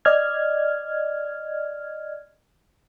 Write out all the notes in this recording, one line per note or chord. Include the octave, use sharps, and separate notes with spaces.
D5 D#5 F6 G#6